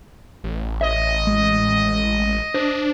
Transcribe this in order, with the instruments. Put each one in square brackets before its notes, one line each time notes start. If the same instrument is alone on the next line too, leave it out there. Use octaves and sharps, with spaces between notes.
[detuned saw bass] A1
[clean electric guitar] C#5 E5 [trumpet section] D#5
[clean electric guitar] G#3
[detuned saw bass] D4 [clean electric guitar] C5